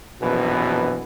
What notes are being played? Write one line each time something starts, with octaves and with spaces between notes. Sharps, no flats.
A#1 F#2 B2 E3